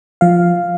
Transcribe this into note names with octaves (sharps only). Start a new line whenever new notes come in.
F3 F5